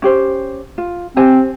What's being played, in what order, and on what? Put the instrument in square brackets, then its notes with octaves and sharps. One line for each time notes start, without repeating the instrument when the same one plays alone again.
[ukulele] C#4 G4 C5
F4
[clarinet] C4 [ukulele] G4 C5 G#5